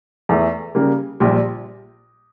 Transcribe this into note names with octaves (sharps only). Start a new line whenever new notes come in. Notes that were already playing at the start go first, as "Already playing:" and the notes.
E2 E3 A3
C#3 G3 A#3
A#1 A#2 G3